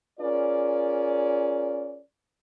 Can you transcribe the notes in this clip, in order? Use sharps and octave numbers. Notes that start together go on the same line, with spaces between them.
C#4 F4 G#4 A#4 D5